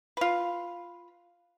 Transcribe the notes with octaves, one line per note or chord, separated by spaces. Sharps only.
F4 B4